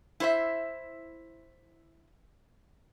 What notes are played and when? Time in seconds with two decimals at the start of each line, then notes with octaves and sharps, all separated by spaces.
0.20 E4 C5 E5